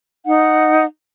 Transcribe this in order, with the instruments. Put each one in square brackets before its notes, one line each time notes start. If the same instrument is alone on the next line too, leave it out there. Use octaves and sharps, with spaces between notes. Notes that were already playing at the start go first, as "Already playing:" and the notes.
[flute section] D#4 F#5